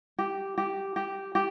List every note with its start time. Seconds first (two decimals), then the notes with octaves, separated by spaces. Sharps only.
0.19 G4
0.58 G4
0.96 G4
1.35 G4